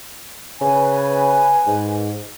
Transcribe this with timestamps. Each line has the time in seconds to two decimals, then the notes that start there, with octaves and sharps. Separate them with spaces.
0.61 C#3 B4 G#5
1.67 G#2